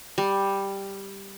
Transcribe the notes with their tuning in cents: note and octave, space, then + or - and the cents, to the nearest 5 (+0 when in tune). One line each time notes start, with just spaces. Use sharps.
G3 +5